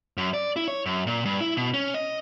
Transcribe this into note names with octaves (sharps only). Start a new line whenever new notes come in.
F#2
D5
E4
C#5
F#2
A#2
G2
E4
B2
C#4
D#5